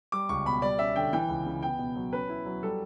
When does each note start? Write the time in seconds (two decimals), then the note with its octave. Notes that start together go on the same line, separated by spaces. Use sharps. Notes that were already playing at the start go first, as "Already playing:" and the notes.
0.12 G3 D6
0.29 C#2 C#6
0.45 B2 B5
0.62 G3 D5
0.79 C#4 E5
0.96 D3 G5
1.13 E3 G5
1.29 C#2
1.45 C#3
1.63 B3 G5
1.79 B2
1.96 F#3
2.13 C#4 B4
2.29 E4
2.46 F#3
2.63 G3 A4